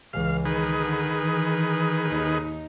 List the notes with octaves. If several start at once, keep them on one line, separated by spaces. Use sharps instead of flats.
C#2 E3 F5
D#3 G#4 B4
D3
E3
D#2 D#4